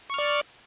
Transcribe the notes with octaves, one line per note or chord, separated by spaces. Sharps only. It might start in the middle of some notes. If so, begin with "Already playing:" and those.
D5 C#6 F6